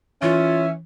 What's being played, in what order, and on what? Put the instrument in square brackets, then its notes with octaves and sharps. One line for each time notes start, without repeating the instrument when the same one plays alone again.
[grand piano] E3 [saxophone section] C#4 [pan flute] F4 [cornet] E5